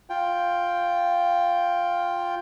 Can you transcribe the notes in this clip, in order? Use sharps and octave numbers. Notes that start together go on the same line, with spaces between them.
F4 G5